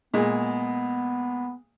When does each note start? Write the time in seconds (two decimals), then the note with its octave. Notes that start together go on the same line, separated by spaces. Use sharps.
0.14 A#2 G#3 B3